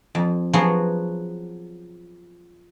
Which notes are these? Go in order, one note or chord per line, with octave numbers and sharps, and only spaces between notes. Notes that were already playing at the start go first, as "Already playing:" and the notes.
F2
F3 F#3 B3 F#4 G#4